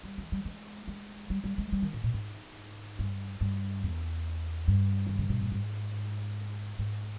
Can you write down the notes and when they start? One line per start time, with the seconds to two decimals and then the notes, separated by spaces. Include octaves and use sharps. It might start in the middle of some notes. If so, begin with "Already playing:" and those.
0.03 G3
0.18 E3
0.32 G3
0.45 G#3
0.88 G#3
1.30 G3
1.44 G3
1.58 G#3
1.72 G3
1.82 D#3
1.93 G#2
2.04 A#2
2.14 G#2
2.99 G2
3.41 G2
3.83 E2
4.68 G2
5.07 D#3
5.19 C#3
5.30 B2
5.41 A#2
5.52 G#2
6.79 G#2